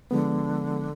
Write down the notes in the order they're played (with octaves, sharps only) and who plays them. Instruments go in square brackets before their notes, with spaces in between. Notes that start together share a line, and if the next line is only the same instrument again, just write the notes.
[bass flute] D3 [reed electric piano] F3 G#3 B3